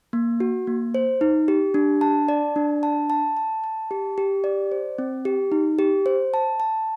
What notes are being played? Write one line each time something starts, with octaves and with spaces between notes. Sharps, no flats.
A#3
F#4
A#3
C5
D#4
G4
D4
A5
D5
D4
A5
A5
A5
A5
G4
G4
D5
C5
C4
G4
D#4
G4
C5
A5
A5